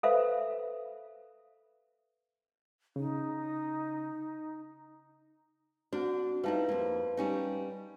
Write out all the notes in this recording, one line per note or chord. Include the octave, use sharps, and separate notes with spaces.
A4 B4 C5 E5 F5
C#3 D#4
C4 D4 F#4
G3 D#4 E4 B4 F5 A5
F2 A#3
G3 C#4 D#4